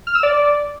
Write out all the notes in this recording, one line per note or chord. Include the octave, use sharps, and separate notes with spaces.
F6
E6
D5